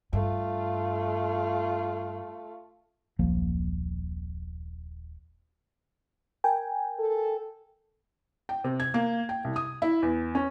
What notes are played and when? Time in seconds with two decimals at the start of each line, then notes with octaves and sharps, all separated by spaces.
0.13 G2 A3 F4
3.19 D#1 B1 F3 A#3
6.44 A#4 G5 G#5
6.99 A4
8.49 G5
8.64 C3
8.80 G#6
8.94 A#3
9.29 G5
9.44 C2
9.56 D#6
9.82 E4
10.02 E2
10.35 C#4